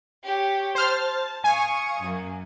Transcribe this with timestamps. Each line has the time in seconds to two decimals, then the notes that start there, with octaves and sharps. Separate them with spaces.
0.24 G4 C#5
0.75 C5 A5 F6
1.44 F5 G#5 C#6 D#6
2.02 F#2 A#3